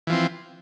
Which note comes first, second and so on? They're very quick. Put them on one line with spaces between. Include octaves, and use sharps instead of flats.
E3 F3 C4